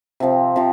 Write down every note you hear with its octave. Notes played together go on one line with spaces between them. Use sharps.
C3 F3 C4
C3 F3